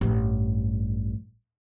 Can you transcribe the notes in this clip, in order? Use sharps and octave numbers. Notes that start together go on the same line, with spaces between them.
A1 G2